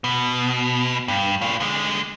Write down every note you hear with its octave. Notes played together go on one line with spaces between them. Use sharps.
B2
G2
A2 F4
D3 G#3